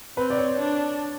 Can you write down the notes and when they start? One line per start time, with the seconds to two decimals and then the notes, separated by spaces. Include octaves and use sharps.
0.17 C4 B4
0.30 D5
0.38 C#5
0.59 D4